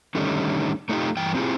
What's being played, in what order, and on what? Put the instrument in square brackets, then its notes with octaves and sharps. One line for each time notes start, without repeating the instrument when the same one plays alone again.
[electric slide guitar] D3 D#3 G3 A3 C#4 D#4
A3 D4 D#4 F4 G4
G2 E3 G5
C4 E4 F4 G4 G#4